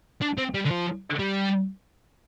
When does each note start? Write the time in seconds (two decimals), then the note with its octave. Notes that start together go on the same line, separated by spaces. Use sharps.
0.22 D4
0.38 C4
0.54 G3
0.65 D3
0.71 F3
1.19 G3